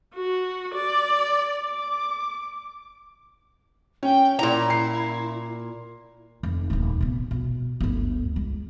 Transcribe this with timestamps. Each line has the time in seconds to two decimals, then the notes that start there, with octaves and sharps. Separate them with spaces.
0.14 F#4
0.75 D5
1.64 D6
4.03 C#4 G5
4.39 A#2 E4 A#5
4.70 C7
6.43 F1 D#3
6.70 D#1 D2
7.01 C3 B3
7.31 B2
7.81 G1 D2
8.36 C#2